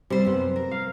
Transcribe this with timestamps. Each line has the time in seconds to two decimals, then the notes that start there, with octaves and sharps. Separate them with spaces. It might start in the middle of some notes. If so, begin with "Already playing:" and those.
0.10 C3 G3 C5
0.25 F#2 B3
0.56 A#4
0.71 F5